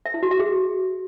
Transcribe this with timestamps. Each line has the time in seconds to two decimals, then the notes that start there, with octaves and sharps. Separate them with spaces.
0.06 E5
0.14 E4
0.23 F#4
0.31 E5
0.40 G#4